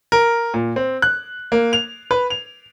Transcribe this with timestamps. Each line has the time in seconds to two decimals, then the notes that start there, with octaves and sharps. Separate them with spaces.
0.12 A#4
0.54 A#2
0.76 C4
1.02 F#6
1.52 A#3
1.73 F7
2.11 B4
2.30 F7